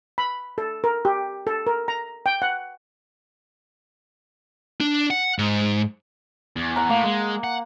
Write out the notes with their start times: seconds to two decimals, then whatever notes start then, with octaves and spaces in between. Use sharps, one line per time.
0.18 B5
0.58 A4
0.84 A#4
1.05 G4
1.47 A4
1.67 A#4
1.88 A#5
2.26 G5
2.42 F#5
4.80 D4
5.11 F#5
5.39 G#2
6.56 E2
6.76 F#5 A#5
6.89 A2 A#3
7.04 G#3
7.44 F#5